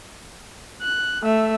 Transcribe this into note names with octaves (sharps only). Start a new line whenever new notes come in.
F#6
A3 E5